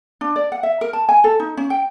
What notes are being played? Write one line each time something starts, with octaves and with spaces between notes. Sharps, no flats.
D4
D5
F#5
E5
A#4
A5
G#5
A4
D#4
C#4
G5